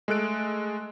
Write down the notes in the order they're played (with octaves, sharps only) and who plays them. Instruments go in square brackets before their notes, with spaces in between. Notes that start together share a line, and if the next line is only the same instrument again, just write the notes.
[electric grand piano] G#3 A3 A4 F#6 D7